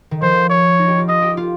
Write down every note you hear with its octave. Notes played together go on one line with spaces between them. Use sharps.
D#3
F3 C5
C#5
D#4
G4
F4
F4 D#5
G4
F4